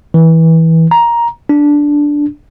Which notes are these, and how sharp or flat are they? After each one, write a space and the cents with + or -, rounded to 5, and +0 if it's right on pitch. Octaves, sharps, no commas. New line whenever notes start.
E3 -20
A#5 +10
D4 -5